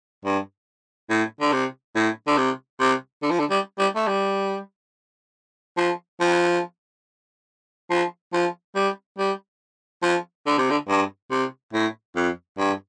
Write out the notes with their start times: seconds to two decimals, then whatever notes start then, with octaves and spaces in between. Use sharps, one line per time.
0.25 G2
1.10 A2
1.41 D3
1.52 C3
1.95 A2
2.27 D3
2.37 C3
2.80 C3
3.23 D3
3.31 F3
3.39 D3
3.50 G3
3.79 G3
3.96 A3
4.07 G3
5.77 F3
6.21 F3
7.90 F3
8.33 F3
8.75 G3
9.18 G3
10.03 F3
10.46 D3
10.58 C3
10.70 D3
10.89 G2
11.31 C3
11.73 A2
12.16 F2
12.59 G2